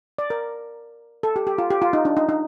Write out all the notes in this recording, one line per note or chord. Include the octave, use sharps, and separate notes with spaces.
D5
A#4
A4
G4
G4
F4
G4
F4
D#4
D4
D#4
D#4